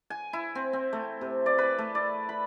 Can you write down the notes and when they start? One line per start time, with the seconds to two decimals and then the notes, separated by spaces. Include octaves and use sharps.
0.10 G#5
0.33 E4
0.55 C4
0.73 C4
0.93 A3
1.21 C3
1.46 D5
1.58 B4
1.79 A3
1.95 D5
2.29 B5